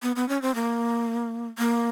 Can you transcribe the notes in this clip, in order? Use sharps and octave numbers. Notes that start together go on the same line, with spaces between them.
B3
B3
C#4
C4
A#3
A#3